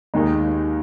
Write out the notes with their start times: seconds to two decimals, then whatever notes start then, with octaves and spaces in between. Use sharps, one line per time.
0.14 D#2 D#3 G#3 D#4